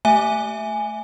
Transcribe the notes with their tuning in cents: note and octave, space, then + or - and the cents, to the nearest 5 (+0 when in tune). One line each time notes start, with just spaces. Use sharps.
A3 +0 E5 +0 G#5 +0